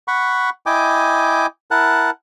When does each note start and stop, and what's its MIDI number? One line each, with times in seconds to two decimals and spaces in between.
0.08 0.50 78
0.08 0.50 83
0.08 0.50 85
0.66 1.46 64
0.66 1.46 75
0.66 1.46 79
0.66 1.46 80
0.66 1.46 86
1.71 2.10 64
1.71 2.10 70
1.71 2.10 78
1.71 2.10 81
1.71 2.10 90